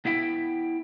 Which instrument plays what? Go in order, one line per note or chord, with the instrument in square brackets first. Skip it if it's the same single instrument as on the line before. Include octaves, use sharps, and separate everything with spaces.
[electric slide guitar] B3 E4 E5 G5